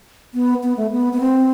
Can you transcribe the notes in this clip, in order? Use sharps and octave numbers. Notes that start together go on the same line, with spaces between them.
B3
B3
A3
B3
B3
C4